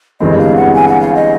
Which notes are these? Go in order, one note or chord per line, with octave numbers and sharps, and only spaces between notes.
G1 G2 E3 G#3 C4 D#5
F5
F#5
G#5
F#5
F5
D#5